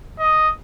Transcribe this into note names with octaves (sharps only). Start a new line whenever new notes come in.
D#5